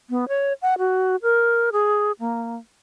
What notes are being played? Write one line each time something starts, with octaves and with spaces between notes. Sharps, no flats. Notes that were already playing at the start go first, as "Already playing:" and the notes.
B3
C#5
F#5
F#4
A#4
G#4
A#3